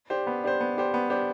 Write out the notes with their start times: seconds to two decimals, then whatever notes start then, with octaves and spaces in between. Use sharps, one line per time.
0.10 D4 G4 C5
0.27 B3
0.44 D4 G4 C5
0.61 B3
0.77 D4 G4 C5
0.94 B3
1.10 D4 G4 C5